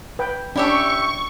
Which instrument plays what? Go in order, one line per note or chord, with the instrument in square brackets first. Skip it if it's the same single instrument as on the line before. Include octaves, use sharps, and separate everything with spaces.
[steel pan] B4 G5
[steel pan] C#4 D4 [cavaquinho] E4 G4 E5 [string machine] C#6